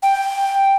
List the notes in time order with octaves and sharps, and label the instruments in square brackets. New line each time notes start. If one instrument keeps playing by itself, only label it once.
[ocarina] G5